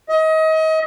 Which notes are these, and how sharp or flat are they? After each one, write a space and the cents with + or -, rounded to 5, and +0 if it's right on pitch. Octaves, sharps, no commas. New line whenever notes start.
D#5 +30